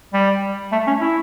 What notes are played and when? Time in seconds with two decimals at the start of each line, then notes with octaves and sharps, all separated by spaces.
0.14 G3
0.72 A3
0.87 C#4
1.01 E4